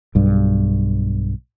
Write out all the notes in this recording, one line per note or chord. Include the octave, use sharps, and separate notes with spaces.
B1 G2